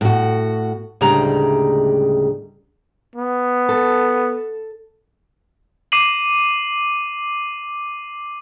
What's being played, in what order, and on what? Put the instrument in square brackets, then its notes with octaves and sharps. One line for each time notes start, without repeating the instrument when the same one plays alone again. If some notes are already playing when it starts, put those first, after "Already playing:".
[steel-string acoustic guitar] A2 F#4
D2 A2 C#3 G3 G#3 A#5
[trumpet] B3
[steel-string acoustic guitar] A4
[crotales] D6 C7 D#7 F#7